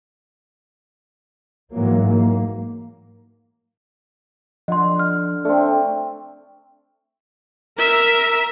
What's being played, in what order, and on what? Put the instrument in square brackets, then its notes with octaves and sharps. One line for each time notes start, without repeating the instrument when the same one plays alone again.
[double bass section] G#2 E3 F#3 A#3
A#3
[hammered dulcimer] D3 [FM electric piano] F3 [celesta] D#5 C6
[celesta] F6
[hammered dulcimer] A3 C4 [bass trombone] D4 [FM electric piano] A4 C5
[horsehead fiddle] A#4 [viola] E5